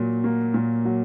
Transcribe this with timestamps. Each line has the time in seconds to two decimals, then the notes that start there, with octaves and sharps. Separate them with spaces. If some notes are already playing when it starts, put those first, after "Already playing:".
Already playing: A#2 F#3
0.24 A#3
0.54 A#2
0.85 F#3